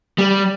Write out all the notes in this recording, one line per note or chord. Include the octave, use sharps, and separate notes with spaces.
G3